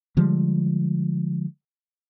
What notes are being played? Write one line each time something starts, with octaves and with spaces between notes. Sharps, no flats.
D3 F3 G3 G#3